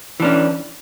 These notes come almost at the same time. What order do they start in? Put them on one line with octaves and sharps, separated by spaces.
E3 D4 C#4